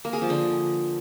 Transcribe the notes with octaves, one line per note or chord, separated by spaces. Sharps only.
A#3
G#4
F3
D3